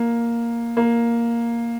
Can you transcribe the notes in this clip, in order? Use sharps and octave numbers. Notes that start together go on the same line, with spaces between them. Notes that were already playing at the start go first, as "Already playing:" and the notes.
Already playing: A#3
A#3